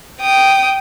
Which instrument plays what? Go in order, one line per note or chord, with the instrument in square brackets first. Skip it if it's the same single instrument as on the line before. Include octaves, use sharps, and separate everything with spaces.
[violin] G5 D#6